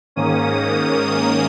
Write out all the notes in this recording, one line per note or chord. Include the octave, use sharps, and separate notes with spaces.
G#2 D#3 A#3 C#4 D#6